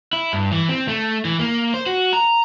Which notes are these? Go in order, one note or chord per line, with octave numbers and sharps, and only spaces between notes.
E4
G2
E3
C4
A3
E3
A#3
C5
F#4
A#5